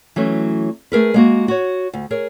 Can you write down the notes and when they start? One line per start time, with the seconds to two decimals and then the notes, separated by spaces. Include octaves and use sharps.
0.16 E3 F#3 A3 C#4
0.92 A3 G#4 A#4 B4
1.14 G#3 A#3 F#4
1.48 F#4 C#5
1.93 D2
2.11 G#4 A#4 C#5